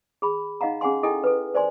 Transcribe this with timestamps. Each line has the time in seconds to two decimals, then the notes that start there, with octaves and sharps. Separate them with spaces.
0.22 G#4 B5
0.61 D#4 D#5 F5 F#5 A#5
0.81 C#4 G#4 F#5 G#5 C6
1.03 E4 G#4 A4 D#5 G5 G#5
1.24 A4 B4
1.54 C5 D5 G#5 C6